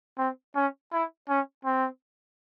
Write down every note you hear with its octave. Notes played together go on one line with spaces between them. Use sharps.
C4
C#4
E4
C#4
C4